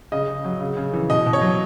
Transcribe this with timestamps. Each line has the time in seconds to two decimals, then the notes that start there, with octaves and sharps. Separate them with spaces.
0.12 C#3 D#5
0.28 C#3
0.45 F#3
0.60 C#3
0.77 C#3
0.93 E3
1.10 B2 D#5
1.26 B2
1.33 C#5
1.41 F#3